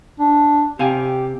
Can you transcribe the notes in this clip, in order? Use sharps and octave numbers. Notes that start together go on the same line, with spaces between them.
D4
C3 G4 F5 G#5